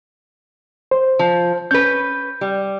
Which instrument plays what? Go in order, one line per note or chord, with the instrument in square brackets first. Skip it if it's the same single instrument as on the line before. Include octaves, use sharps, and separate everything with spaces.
[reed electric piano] C5
[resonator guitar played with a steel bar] F3
[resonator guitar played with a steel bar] C#4 B4 [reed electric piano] G6
[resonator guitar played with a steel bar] G3